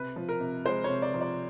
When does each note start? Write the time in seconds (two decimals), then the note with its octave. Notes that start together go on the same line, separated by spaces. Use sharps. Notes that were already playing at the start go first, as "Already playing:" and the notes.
Already playing: C3 B4
0.16 F3
0.29 A#4
0.40 C3
0.66 G#3 C5
0.84 C#5
0.90 C3
1.02 D5
1.14 F3
1.21 D5